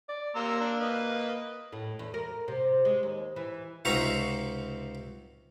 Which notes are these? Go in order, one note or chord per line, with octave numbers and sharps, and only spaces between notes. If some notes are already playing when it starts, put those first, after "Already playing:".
D5
A#3 A#5 C6 E6
D4
B4 D#5
A2
E2
A#4
C3
G#3
D#2
E3
C#2 C3 D#4 F#4 E5 A#5